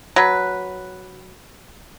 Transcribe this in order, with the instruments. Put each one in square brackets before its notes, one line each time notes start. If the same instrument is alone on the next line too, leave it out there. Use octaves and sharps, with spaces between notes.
[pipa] F#3 B4